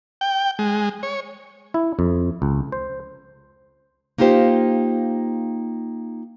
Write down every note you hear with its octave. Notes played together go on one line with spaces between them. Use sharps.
G5
G#3
C#5
E4
F2
C#2
C5
A#3 D#4 F4 G4 C5